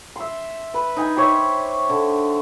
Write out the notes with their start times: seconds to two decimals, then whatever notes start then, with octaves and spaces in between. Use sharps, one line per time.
0.16 E5 C6
0.74 B4
0.97 D#4 G#5
1.16 G4 C5 C#5 E5
1.89 D3